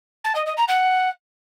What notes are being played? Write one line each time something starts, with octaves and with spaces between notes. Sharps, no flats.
A5
D#5
D#5
A#5
F#5